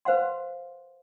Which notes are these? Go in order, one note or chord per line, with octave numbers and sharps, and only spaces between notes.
B4 C5 F5 F#5 C6